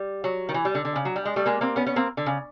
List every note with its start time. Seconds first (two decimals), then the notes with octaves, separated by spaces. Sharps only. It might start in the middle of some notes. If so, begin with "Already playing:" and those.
Already playing: G3
0.24 F#3
0.49 D#3
0.54 E3
0.65 G3
0.75 D3
0.85 D3
0.96 C#3
1.05 F#3
1.16 G3
1.25 G#3
1.36 G3 A3
1.46 G#3 A#3
1.61 A#3 C4
1.76 B3 C#4
1.86 B3 C#4
1.96 A#3 C4
2.17 D3
2.26 C#3